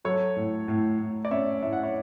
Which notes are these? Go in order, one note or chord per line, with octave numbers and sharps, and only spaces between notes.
F#3 A4 C#5
A2
A2
A2
D5
C#4 C#5 E5
A2 E5
F#5
C#5 E5